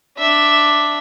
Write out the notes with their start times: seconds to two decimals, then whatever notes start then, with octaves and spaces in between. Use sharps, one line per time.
0.18 D4 E5